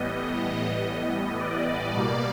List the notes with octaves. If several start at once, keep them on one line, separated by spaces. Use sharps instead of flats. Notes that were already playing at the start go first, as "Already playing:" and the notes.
Already playing: A2 E3 G3 B3 D#5
D5
B2 G3 A#3